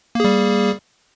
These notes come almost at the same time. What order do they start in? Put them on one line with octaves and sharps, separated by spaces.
A#3 G#4 G3